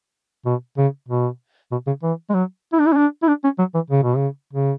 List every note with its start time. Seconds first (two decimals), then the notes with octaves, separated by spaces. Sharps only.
0.46 B2
0.77 C#3
1.08 B2
1.72 B2
1.87 C#3
2.03 E3
2.30 G#3
2.34 F#3
2.72 E4
2.79 D4
2.87 E4
2.93 C#4
2.97 D4
3.23 E4
3.28 D4
3.44 C#4
3.59 F#3
3.74 E3
3.91 C#3
4.03 B2
4.16 C#3
4.53 C#3